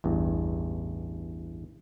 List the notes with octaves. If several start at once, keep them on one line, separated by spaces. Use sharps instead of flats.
A1 E2 G2